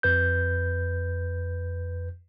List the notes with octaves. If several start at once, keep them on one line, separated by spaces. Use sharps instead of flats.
F2 B4 G6